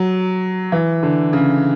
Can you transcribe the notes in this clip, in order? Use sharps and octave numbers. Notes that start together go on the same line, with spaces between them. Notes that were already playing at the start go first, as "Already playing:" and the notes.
Already playing: F#3
E3
D3
C#3